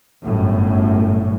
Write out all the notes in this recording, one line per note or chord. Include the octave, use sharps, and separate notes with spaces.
G1 F#2 A2